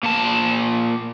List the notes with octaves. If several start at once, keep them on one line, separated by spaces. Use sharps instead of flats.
A#2 A5